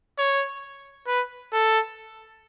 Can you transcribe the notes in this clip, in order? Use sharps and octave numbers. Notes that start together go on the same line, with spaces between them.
C#5
B4
A4